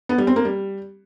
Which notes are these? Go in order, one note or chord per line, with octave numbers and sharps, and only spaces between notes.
B3
G3
C4
A#3
G3